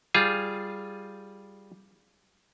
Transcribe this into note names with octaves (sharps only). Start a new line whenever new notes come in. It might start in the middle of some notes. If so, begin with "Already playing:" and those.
G3 F4 G#4